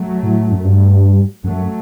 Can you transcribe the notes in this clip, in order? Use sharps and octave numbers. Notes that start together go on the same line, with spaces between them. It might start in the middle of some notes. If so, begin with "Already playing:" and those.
Already playing: F#3 A3
A2
F#2
G2
F#2 F#3 A3